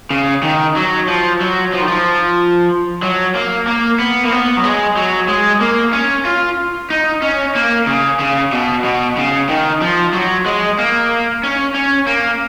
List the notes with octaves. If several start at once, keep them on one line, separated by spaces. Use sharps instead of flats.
C#3
D#3
F#3
F3
F#3
F3
D#3
F3
F#3
A#3
A#3
B3
A#3
B3
F#3
G#3
F#3
G#3
A#3
C#4
F4
D#4
C#4
A#3
C#3
C#3
B2
B2
C#3
D#3
F3
F#3
G#3
A#3
C#4
C#4
A#3